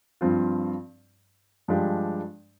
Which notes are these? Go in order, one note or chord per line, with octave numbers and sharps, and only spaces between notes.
G2 F3 C4 F4
G2 F3 G#3 D4 G4